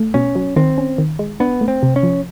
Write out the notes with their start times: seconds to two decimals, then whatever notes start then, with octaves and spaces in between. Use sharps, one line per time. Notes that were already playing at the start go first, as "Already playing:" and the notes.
Already playing: A3
0.14 B2 C#4
0.35 F#3
0.56 D#3 C4
0.78 C#4
0.98 D#3
1.19 G#3
1.40 B3 D4
1.61 A3
1.68 C4
1.83 C3
1.96 C#4
2.03 F3